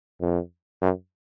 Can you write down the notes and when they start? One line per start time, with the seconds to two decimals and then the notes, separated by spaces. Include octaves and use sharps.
0.21 F2
0.82 F#2